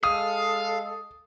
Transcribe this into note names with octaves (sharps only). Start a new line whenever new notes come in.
G#3 A4 F5 D#6